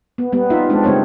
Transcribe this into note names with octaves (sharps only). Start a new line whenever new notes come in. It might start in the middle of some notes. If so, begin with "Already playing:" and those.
B3
G3 B3
D#4 F4 E5
G#3 C4 D4
C#3 G3 A3 C4 C#5